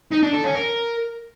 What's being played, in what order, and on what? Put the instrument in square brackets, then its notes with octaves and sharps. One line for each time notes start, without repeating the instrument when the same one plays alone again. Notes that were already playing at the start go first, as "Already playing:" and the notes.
[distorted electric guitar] D#4
D4
A4
C#4
A#4